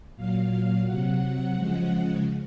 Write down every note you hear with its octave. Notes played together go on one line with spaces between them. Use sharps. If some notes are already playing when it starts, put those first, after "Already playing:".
A#2 F#3 F5
F5
C3 F#3 F#5
C#3 F3 G#3